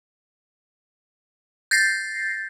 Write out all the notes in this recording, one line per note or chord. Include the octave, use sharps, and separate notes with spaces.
G6 A6 A#6 C7